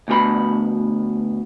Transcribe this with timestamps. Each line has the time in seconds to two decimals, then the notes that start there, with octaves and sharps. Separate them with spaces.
0.08 D2 B2 G4 B5